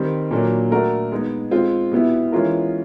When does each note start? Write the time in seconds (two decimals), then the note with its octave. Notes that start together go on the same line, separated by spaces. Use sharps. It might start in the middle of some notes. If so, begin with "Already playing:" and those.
Already playing: D#3 G3 C4
0.31 A#2 F#3 A#3 D4
0.71 A3 D4 F#4 A#4
1.12 G#3 B3 D#4
1.51 G#3 C4 F4
1.91 B2 G3 B3 E4
2.32 E3 G#3 C#4 F4 A#4